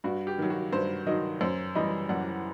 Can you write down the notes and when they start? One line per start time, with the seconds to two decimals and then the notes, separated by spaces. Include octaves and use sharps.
0.04 G2 F#4
0.27 G4
0.38 D#3 F#3
0.50 F#4
0.73 G2 C5
1.06 D#3 F#3 D#5
1.41 F#2 C5
1.75 E3 G3 D#5
2.09 F#2 F#5